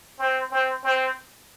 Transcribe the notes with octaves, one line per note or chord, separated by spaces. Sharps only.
C4
C4
C4